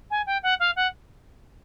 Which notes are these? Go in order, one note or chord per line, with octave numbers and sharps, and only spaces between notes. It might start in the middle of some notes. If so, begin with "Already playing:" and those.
G#5
G5
F#5
F5
F#5